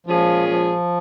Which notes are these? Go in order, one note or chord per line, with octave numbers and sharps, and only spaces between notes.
A#2 F3 G#3 C#4 F4 G#4
F3